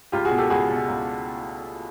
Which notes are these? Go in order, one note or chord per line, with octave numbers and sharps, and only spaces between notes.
C#2 F4 G4
F#4 G#4
B2
G4 A4
C#2 F#4 G#4
B2
C#2